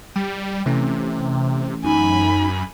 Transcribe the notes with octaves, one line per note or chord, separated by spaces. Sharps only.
G3 G5
C3 E3 A3 C#4
F#2 D#4 G#5 B5